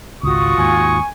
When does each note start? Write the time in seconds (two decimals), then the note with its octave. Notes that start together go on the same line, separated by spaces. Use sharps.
0.23 G#1 C#2 F4 F#4 C#6 D#6
0.58 D#2 G#2 G#5